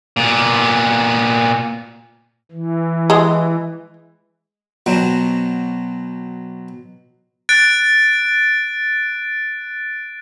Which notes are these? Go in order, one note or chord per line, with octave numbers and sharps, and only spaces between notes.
A#2 B3
E3
G#3
B2 F#3 C4
F#6 A6 D7